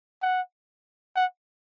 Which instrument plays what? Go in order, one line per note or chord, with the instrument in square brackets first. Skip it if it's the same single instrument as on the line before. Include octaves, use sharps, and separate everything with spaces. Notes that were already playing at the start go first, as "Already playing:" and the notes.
[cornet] F#5
F#5